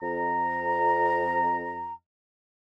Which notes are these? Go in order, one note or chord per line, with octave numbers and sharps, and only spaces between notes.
F2 A#5